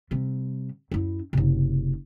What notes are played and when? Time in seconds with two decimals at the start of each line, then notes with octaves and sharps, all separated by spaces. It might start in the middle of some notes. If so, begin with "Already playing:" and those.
0.11 C3 G3
0.91 F#2 E4
1.33 F#1 C3